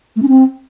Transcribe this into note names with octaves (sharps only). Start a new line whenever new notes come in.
A3
C#4
C4